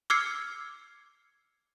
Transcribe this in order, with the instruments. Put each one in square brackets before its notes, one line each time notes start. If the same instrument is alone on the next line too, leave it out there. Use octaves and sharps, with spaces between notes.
[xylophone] D6 E6 F6 G#6 C7 C#7